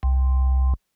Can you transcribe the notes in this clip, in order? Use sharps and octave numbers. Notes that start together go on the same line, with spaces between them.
C2